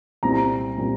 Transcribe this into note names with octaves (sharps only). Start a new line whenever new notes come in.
C2 A#2 G3 C4 A#5
A#2 G3 C4